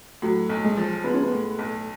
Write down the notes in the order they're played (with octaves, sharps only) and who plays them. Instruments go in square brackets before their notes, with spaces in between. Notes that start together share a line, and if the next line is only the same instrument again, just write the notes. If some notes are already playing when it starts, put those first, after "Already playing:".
[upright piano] A2 [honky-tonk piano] F#3
[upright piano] B1
[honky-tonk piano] G#3
[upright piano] F3
[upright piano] G#3 [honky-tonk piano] B3
[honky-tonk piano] C#4
B3
[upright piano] A2
B1